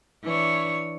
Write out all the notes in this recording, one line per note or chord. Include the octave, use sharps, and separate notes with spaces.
E3 D4 C#5